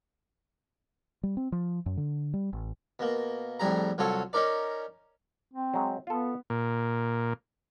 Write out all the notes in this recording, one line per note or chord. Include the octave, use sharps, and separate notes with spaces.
G3
C4
F3
F#2
D3
G3
A1
B2 A#3
F2 A2 G3 G#4 A#5
C2 F#3 F4 A4 C#5
C#4 D#4 A#4 D5
C4
F#3 G#3
B3 F4 A4
A#2